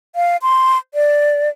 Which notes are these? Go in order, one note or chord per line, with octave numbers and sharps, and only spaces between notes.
F5
C6
D5